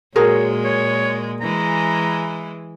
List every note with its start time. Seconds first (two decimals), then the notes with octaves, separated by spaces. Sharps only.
0.16 A#2 G#3 F#4 G#4 A#4 C#5
0.64 C#5
1.41 E3 G#3 A#5